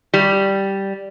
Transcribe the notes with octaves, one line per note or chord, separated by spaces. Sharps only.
G3